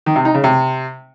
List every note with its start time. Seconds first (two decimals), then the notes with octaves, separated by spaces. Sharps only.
0.06 D#3
0.16 C3
0.25 D#4
0.34 C#3
0.44 C3